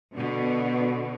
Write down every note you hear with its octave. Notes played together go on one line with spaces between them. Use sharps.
B2 D3